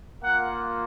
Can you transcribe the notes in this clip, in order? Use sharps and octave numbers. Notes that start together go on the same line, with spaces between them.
A#3 F4 F#5